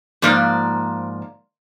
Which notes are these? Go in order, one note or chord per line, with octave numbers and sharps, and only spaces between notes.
G#2 F3 A#3 D5